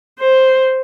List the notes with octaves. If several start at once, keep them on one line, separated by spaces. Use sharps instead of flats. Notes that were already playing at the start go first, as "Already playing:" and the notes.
C5